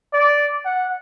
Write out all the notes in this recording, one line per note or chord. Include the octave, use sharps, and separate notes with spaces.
D5
F#5